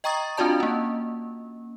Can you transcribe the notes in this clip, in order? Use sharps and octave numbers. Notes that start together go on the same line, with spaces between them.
D#5 G5 A#5 C#6 D#6 A6
C4 D4 F4 F#4 D5 A5
A#3 C#4